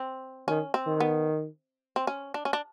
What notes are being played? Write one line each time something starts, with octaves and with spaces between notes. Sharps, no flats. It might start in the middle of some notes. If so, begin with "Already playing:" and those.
Already playing: C4
D#3 C#4
C4
D#3
B3
C4
C#4
D4
C#4
D4